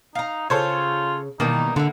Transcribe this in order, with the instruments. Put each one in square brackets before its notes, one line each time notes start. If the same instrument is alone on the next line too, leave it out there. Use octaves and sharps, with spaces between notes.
[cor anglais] D#4 [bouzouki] F5 A#5
[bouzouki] C#3 [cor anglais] F4 [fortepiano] A4 C5 C#5
[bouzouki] B2 E3 G3 [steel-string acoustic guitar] D#3 [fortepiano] A#3 [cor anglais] D#4
[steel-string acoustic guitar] D3 [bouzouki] E4 F4 [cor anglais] F#5